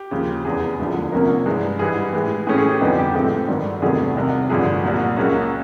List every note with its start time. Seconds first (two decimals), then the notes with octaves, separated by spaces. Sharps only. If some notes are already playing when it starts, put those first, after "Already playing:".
Already playing: G4
0.11 D#2 C#3 F3
0.45 F1 E2 C#3 E3 G#4
0.79 E1 D2 D3 F3
1.12 C2 C3 F3 A#3 C#4 A#4
1.46 G2 E3 G#3
1.79 G#2 E3 G3 G#4
2.13 A2 E3 G#3
2.47 A2 E3 A3 C#4 G#4
2.58 G#4
2.69 G4
2.81 F2 D3 G3 B3 D#4 G4
2.98 G4
3.14 A2 F3 G#3 C4 D#4 A4
3.48 G#1 G2 D#3 F#3
3.82 E2 C3 D#3 F#3 A3 G#4
4.15 C2 C3 D#3 G3
4.49 A1 G2 D3 F3 G#4
4.83 C2 A#2 F#3
5.17 C#2 C#3 F#3 A#3 C#4